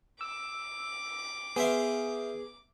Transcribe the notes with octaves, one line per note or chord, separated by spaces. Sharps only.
D6 E6
B3 G#4 C5 E5 F5